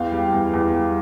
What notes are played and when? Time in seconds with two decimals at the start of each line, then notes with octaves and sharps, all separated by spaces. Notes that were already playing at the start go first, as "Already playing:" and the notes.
Already playing: E2 F5 G5
0.12 G3
0.33 E2
0.54 E2
0.75 G3